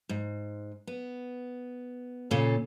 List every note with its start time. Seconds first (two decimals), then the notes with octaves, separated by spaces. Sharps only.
0.09 G#2
0.87 B3
2.31 A#2 C#3 C#4 A4 F5